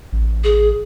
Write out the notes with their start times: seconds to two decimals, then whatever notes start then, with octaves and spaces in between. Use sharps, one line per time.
0.12 A1
0.44 G#4